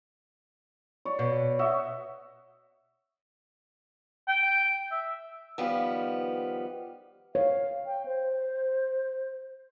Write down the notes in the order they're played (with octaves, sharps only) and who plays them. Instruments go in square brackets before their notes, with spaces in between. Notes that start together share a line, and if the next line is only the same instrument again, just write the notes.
[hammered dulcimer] C#5 D5
[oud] B2
[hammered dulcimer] F#4 D#5 E5
[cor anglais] G5
E5
[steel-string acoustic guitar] D#3 F3 G3 B3
[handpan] C#5 [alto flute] F5
[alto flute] G5
C5